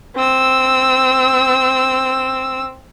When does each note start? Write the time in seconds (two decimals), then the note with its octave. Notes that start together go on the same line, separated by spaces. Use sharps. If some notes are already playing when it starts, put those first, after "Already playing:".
0.16 C4 E6